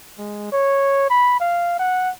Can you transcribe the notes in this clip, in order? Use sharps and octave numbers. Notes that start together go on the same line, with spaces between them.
G#3
C#5
B5
F5
F#5